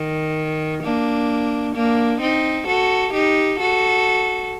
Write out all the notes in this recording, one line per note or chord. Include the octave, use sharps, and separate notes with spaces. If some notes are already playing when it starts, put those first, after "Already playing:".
Already playing: D#3
A#3 D4
A#3 D4
C4 D#4
F#4 A4
D#4 G4
F#4 A4